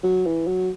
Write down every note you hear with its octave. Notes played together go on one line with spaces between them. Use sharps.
F#3
E3
F#3